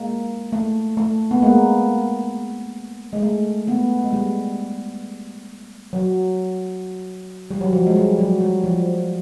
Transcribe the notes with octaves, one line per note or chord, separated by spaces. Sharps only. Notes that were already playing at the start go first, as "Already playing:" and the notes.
Already playing: G#3 A#3
A3
A3
B3
G#3 A#3
G#3
A3
A3 B3
G#3
G3
F#3
G3
F#3
F3
G#3
G3
F#3
G3
F3